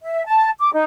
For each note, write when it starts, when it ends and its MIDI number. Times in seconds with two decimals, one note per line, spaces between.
0.03 0.25 76
0.26 0.50 81
0.60 0.72 86
0.73 0.84 63